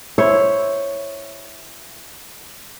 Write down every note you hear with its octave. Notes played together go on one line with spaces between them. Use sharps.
E4 C5 C#5